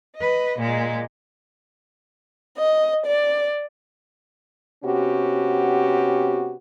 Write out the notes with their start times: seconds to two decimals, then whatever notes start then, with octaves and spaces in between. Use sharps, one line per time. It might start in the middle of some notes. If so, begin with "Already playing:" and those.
0.17 B4 D#5
0.58 A#2 G#3
2.57 D#5
3.06 D5
4.84 C3 B3 C#4 F#4 G4